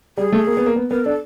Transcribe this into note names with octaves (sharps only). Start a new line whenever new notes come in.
G3 G#4
A3
A#3
B3
A#3
B3
B3 A#4
D4 A4